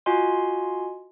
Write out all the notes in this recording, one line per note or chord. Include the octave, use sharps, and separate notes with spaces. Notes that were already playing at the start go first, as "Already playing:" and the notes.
F4 F#4 D#5 G#5 C6